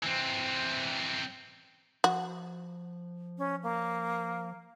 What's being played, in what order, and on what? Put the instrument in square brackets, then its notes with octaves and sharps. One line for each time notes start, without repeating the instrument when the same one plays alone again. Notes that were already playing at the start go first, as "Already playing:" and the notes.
[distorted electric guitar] E3 C4
[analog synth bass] F3 [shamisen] F#4
[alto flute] C#4
A#3